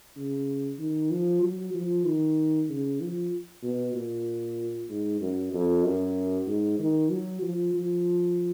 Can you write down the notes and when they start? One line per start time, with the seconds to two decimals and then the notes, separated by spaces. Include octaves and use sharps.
0.17 C#3
0.79 D#3
1.10 F3
1.42 F#3
1.74 F3
2.06 D#3
2.69 C#3
3.01 F3
3.63 B2
3.94 A#2
4.89 G#2
5.21 F#2
5.53 F2
5.84 F#2
6.47 G#2
6.79 D#3
7.11 F#3
7.42 F3
7.74 F3